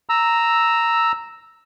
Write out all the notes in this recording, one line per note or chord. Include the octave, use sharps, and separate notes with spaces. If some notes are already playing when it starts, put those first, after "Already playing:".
A#5 E6